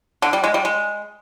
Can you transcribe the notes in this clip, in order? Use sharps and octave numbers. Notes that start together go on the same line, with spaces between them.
D3
G3
G#3
G3
G#3